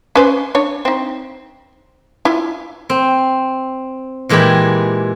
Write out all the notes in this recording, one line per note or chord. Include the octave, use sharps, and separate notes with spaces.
C#4 B4 C5
D4 C#5
C4 D#4
E4 F4
C4
A#2 E3 G#3 G4 G#4 B5